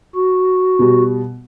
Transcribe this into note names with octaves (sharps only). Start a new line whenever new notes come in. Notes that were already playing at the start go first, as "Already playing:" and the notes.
F#4
B2 G3